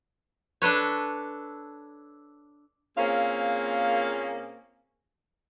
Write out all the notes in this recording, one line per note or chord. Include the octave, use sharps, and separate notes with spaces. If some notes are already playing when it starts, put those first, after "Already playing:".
D4 A4 B4 C#5
A#2 A#3 C4 C#4 G#4 F5